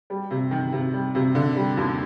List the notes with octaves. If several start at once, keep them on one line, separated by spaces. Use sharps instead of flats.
G3
C3
D#3
C3
G3
C3
D3
G3
D#2